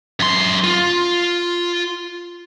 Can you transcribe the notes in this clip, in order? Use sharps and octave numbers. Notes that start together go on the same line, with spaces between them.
F#2 C6
F4